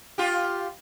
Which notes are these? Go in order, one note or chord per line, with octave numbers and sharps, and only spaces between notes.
F4 G4